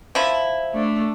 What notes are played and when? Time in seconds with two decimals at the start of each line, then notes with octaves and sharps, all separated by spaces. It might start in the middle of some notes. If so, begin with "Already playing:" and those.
0.15 F3 E4
0.73 A3 D4